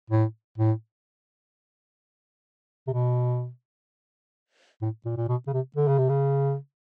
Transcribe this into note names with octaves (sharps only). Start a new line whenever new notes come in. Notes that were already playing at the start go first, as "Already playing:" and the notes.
A2
A2
C3
B2
A2
A#2
A#2
B2
C#3
C3
D3
C#3
C3
C#3